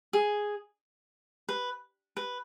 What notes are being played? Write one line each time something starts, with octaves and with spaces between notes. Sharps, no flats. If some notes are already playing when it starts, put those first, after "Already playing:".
G#4
B4
B4